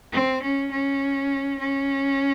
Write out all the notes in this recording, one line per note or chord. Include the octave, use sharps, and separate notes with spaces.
C4
C#4
C#4
C#4